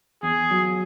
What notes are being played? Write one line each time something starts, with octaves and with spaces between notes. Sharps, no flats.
E2 G#4
F#3